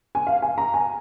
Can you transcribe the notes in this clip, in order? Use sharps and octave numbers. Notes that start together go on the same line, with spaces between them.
G#5
F5
G#5
A#5
G#5